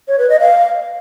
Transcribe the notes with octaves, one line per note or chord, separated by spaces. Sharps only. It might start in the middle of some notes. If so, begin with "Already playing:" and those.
C#5
B4
D#5
F5